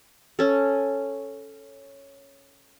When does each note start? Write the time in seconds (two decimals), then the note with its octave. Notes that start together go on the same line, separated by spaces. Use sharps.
0.39 C#4 A4